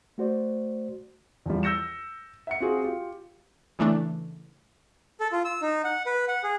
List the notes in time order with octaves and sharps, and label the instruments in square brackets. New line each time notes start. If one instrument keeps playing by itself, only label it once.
[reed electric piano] A3 F#4 C5 D5
[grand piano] E2 F3 G3
E6 G6 A#6 C#7 E7
E5 F#5 C#7
C4 F4 F#4 G#4
F4 G4
[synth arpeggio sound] C#3 E3 A3 D4
[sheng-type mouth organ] A4
F4
E6
D#4
F#5
B4
F#5
G#4